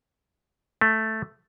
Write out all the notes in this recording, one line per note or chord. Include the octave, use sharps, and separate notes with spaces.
A3